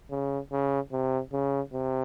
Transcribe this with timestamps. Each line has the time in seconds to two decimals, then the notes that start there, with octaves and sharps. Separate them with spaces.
0.11 C#3
0.52 C#3
0.92 C3
1.33 C#3
1.73 C3